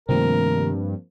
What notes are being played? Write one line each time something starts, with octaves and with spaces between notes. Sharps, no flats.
G2 C3 D#3 F3 A3 A#3 C4 A#4